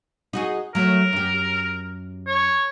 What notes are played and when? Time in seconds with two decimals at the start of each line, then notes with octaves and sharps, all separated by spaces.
0.33 D#4 F#4 G#4
0.75 F#3 A3 A#4
1.13 F#2 G4
2.27 C#5